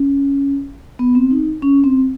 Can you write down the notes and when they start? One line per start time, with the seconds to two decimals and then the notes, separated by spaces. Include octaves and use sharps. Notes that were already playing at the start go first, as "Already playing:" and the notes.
Already playing: C#4
0.99 B3
1.15 C4
1.31 D#4
1.62 C#4
1.84 C4